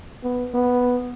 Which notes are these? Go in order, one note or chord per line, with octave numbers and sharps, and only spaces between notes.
B3
B3